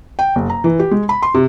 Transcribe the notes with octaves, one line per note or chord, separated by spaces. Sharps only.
G5
F#1
A#5
E3
G4
G#3
B5
C6
C3